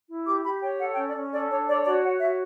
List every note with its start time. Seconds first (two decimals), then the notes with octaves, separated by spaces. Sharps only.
0.08 E4
0.26 G4 D6
0.44 G4 B5
0.62 C#5 G5
0.79 A4 F#5
0.92 G5
0.96 C#4
1.06 D5
1.15 C#4
1.32 A4 D5
1.49 D4 C#5
1.67 C#5 D5
1.85 F#4 D5
2.02 C#5 F#5
2.20 F#4 E5